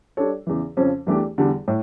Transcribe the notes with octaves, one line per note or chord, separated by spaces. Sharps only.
G3 D4 A4 C#5
E2 C#3 E3
F2 C#3 F3 C#4
E2 E3 A3 D4 G4
E2 D3 G3
A2